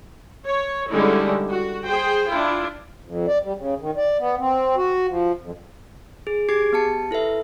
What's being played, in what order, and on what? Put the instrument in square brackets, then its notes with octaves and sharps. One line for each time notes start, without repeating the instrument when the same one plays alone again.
[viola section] C#5
D3 G3 G#3 C#4 D#4 E4
F#4
G#4 C5 G5
D4 E4 F4
[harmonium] F2
D5
G3
C#3
D#3
D5
B3
C4
F#4
F3
F2
[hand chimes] G#4
G4 G#4 D6 G#6 C7 D7
B3 G4 A5 C#7
E4 A4 B4 E5